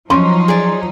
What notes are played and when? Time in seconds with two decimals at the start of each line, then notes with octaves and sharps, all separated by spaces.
0.10 F3 F#3 C#4 D#4 C6
0.48 G#4 D5